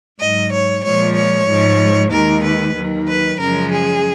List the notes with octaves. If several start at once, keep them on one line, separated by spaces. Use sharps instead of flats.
G#2 F#3 D#5
C#5
A#2 F3 G#3 C#5
C#5
G#2 F3 G#3
D#2 D#3 G#3 A#4
B4
D#2 D#3 F#3
B4
F#2 C#3 F3 G#3 A#4
G#4